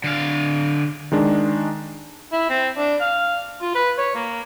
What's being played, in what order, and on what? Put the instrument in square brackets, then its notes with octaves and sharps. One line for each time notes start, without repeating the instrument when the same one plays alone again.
[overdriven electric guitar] D3 F5
[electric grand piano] D#3 G#3 D4
[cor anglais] E4
C4
D4
F5
F4
B4
C#5
A#3